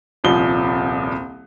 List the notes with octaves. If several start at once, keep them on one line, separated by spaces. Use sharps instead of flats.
D#1 C2 F3 G7